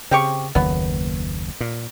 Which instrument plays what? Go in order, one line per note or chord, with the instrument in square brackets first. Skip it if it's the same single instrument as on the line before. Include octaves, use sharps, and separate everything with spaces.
[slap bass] C#3 [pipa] C4 G4 C#6
[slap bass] F#1 D#2 [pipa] B3
[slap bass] A#2